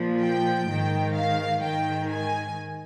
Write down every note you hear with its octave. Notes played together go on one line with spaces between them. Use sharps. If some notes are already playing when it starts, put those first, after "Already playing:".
Already playing: A#2 F3
G5
G#2 D#3
F5
G#2 D#3 G5
G#5